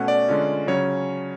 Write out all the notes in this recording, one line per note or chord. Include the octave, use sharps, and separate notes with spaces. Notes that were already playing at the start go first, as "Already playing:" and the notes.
Already playing: B2 A3 C#4 F#5
D5
D3 G#3 C#4 F4
C#3 F#3 C#4 C#5